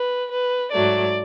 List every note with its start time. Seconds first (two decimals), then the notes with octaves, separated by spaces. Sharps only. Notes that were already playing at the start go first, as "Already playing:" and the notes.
Already playing: B4
0.30 B4
0.71 G#2 F#3 A3 D5